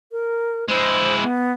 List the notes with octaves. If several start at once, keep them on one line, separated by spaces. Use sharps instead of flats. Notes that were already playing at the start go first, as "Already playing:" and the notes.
A#4
G#3 E4 C5
B3